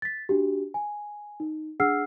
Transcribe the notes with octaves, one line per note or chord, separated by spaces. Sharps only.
A6 B6
D4 F#4 G4
G#5
D#4
D4 G#4 F#5 E6 F6 C7